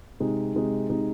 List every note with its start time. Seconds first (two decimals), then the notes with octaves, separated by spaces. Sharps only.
0.20 C3 G#3 D#4
0.55 C3 G#3 D#4
0.90 C3 G#3 D#4